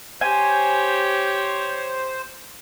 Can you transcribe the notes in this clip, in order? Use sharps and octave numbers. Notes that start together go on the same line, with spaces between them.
G4 C5 C#5 G#5